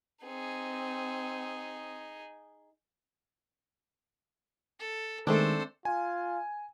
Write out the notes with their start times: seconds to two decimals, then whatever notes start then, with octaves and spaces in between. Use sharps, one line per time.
0.24 C4 D#4 G#4
4.79 A4
5.27 D#3 G#3 A3 C4 D4 A4 C5
5.85 F4 G#5